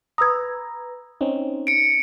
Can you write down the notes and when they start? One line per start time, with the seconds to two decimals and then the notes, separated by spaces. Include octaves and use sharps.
0.18 B4 A#5 D#6 E6 G#6
1.21 C4 C#4 D#4
1.67 C#7 D7